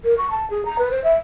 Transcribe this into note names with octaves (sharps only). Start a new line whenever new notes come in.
A#4
C#6
A5
G#4
A#5
B4
C5
E5